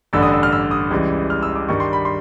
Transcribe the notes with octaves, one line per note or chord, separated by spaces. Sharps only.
A1 G2 D3 E6
D#6
E6
F6
E6
D#6
C#2 C#3 E3 G3
F6
E6
D6
G2 D#3 G3 C#6
C6
B5
C6